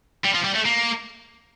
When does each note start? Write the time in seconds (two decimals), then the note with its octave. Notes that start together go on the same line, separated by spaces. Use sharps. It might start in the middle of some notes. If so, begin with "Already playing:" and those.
0.24 G3
0.34 F3
0.44 G3
0.55 A3
0.65 A#3